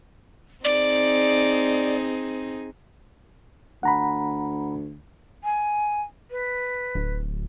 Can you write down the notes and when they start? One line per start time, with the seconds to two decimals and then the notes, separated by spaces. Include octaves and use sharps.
0.65 C4 D#4 G#4 D5
3.83 D2 F#5 A#5 B5
5.44 G#5
6.31 B4
6.95 D1